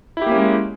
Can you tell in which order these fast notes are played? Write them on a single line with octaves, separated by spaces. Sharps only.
E4 G4 A#3 C#4 G#3